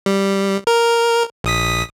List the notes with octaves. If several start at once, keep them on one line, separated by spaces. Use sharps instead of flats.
G3
A#4
A#1 D#6 B6